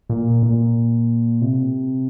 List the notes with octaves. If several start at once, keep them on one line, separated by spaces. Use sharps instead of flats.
A#2
A#2
C3